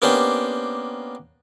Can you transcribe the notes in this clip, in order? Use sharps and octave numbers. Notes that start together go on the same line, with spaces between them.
A#3 B3 C#4 D4 G4 C5